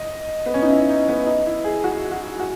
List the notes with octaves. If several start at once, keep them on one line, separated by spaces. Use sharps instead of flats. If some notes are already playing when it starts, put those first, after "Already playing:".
Already playing: D#5
B3
C#4
D#4
E4
D#4
B3
D#4
E4
G#4
F#4
F#4
F#4